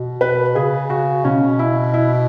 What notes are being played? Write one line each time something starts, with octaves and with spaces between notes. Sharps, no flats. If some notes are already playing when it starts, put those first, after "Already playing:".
Already playing: B2
B4
C#3 G#4
F#4
B2 C#4
E4
E4